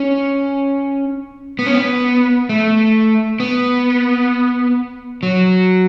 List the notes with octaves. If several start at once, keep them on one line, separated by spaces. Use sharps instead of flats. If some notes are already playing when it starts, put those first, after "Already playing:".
Already playing: C#4
B3
C#4
B3
A3
B3
F#3